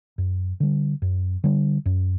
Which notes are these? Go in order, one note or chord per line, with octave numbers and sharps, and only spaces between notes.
F#2
D3 G3
F#2
D3 G3
F#2